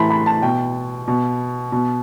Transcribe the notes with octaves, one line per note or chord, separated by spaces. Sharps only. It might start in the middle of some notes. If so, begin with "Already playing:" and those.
Already playing: A2 E3 A5 B5 C6
B5
A5
B2 G5
B2
B2